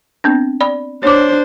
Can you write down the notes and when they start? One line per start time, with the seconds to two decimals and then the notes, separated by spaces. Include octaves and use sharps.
0.24 B3 C4 D4
0.61 D5 B5
1.03 D4 C5 C#5 D6